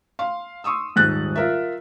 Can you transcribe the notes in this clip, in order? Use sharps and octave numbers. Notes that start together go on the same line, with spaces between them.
F5 C6
C6 C#6 D#6 E6
D#1 G#2 G#4 F#6 G6 A6
F4 A#4 E5